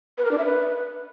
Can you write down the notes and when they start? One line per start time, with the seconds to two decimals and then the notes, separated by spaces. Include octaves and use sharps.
0.18 B4
0.25 A#4
0.31 D4
0.38 E5
0.45 B4